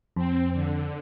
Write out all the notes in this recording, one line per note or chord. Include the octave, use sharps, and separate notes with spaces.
F2 C4
D3